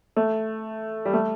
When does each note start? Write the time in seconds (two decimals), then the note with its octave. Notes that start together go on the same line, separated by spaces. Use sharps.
0.17 A3
1.05 G3
1.13 A3